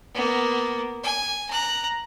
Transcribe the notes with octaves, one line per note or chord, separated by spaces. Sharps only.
A#3 B3
G#5
A#5 F#6